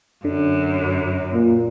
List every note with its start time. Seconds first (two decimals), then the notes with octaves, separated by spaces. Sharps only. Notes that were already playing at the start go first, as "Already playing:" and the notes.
0.25 F#2 D3
1.32 A#2